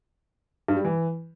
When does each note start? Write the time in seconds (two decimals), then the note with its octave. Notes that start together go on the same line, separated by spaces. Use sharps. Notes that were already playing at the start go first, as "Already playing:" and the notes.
0.68 G2
0.77 G3
0.85 E3